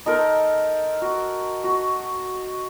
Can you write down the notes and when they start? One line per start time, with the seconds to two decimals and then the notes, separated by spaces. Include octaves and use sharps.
0.06 D#4 A4 A#4 C5
1.02 F#4
1.64 F#4